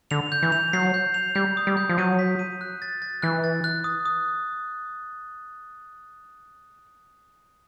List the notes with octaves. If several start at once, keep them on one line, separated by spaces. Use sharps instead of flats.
D3 F7
G6
E3
F7
F#3 C7
G6
F7
G3 G6
D#6
G3
G6
F3
F#3 D#7
B6
D#7
F#6
A6
A6
E3 F#6
A6
F#6
D#6
D#6